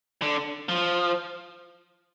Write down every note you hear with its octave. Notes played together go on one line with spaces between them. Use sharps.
D3
F3